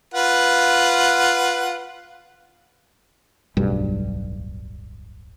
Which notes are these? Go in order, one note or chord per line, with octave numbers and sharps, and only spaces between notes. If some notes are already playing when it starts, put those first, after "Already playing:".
F4 B4 F#5
D1 B1 G2 G3